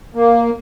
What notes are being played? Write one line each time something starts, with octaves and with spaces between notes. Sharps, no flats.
A#3